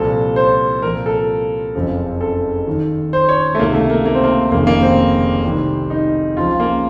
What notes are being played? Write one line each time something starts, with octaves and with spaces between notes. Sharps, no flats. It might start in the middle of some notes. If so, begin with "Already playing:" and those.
Already playing: C2 A#2 F3 A4
C5
C2 A#2 F3 A#4
A4
F#1 F2 C#3 F3
A4
D#2 D#3
C5
C#5
A3
C#2 C3 D#3 A#3
A3
A#3
A#3
C4
A#3
F1 D#2 C#3 A#3
A#3
C4
C2 C3 D#3
D#4
C#2 C#3 F3 F4
A#3